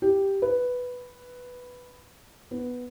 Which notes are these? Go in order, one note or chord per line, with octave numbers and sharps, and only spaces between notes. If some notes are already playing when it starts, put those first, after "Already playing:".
G4
B4
B3